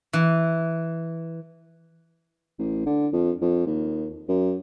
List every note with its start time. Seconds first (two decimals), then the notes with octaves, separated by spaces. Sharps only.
0.13 E3
2.58 A1
2.86 D3
3.13 F2
3.41 F2
3.66 D#2
4.28 F#2